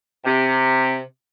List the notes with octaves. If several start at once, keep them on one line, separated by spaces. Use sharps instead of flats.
C3